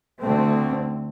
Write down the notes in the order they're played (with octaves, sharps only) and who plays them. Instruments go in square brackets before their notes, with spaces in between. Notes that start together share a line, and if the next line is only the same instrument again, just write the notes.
[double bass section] D2 D3 A3 C4